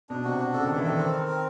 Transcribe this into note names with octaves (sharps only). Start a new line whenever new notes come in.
B2 D4
C3 F#4
D4
C#3 A4
D#3 D4
E3
D#3 A4
C4
A#4
C4